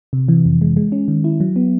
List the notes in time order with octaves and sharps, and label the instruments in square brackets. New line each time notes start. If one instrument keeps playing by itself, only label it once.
[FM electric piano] C3
E3
F2
G#3
G#3
C#4
D#3
E4
F#3
B3